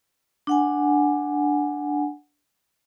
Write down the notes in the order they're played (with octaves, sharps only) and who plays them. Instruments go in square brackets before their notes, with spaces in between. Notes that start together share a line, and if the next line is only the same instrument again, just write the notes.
[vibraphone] D4 F#5 G#5